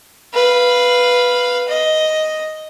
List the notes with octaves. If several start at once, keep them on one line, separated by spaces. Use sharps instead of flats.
B4 F5
D#5